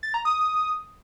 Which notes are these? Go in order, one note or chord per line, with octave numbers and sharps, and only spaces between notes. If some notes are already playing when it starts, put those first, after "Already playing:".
A6
A#5
D#6